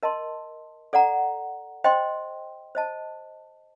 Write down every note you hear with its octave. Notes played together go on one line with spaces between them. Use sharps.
A#4 D#5 A5 C6
A4 D5 F#5 A#5
C5 D#5 G5 C6
C5 D#5 A5